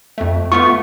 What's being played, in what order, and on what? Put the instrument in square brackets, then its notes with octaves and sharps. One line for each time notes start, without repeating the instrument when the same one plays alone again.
[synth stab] F2 A3
[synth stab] A3 B3 F4 [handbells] C#6